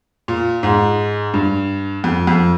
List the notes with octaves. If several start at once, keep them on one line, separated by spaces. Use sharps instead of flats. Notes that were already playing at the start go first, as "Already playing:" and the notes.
A#2
G#2
G2
F2
F2